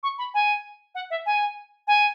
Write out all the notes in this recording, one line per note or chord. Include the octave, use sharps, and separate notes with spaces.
C#6
B5
G#5
F#5
E5
G#5
G#5